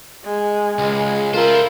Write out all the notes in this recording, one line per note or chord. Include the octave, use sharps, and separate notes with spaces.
G#3
C#2 G#3
E4 F4 A4 A#4 C5